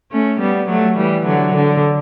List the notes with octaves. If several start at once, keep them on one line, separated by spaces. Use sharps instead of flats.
A3 C#4
G3 B3
F#3 A3
E3 G3
D3 F#3
D3